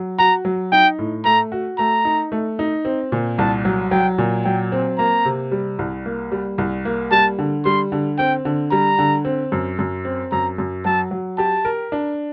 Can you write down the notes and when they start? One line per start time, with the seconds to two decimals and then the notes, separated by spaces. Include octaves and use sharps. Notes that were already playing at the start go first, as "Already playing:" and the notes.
Already playing: F#3
0.19 F#4 A#5
0.45 F#3
0.72 D#4 G5
0.99 A2
1.25 A3 A#5
1.52 F#4
1.78 A3 A#5
2.05 D#4
2.32 A3
2.59 D#4
2.85 C4
3.12 A#2
3.38 C2 A5
3.65 F#3
3.91 F#3 G5
4.18 A#2
4.45 F#3 G5
4.72 C4
4.98 A#3 A#5
5.25 C3
5.51 G3
5.79 C2
6.06 A#3
6.32 G3
6.58 C2
6.85 A#3
7.11 G3 A5
7.39 D3
7.65 G3 C6
7.92 D3
8.19 C4 G5
8.45 D3
8.72 G3 A#5
8.99 D3
9.25 C4
9.52 F#2
9.79 F#2
10.05 C4
10.32 F#2 A#5
10.58 F#2
10.85 F#3 A5
11.11 F#3
11.38 G4 A5
11.65 A#4
11.92 D4